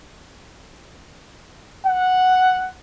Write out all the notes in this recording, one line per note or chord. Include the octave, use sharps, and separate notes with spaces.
F#5